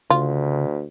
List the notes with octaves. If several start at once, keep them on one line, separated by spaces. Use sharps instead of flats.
D2 C#3 F4